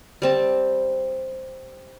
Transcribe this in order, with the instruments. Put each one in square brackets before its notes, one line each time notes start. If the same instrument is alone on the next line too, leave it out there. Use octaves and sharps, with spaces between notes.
[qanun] G3 C4 A5